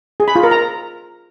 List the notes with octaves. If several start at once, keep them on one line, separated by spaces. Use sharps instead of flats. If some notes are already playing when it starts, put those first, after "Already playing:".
G#4
B5
F4
A#4
A#5